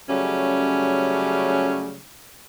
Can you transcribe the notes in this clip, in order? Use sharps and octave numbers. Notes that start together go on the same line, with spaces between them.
C#3 F#3 G3 A3 C#4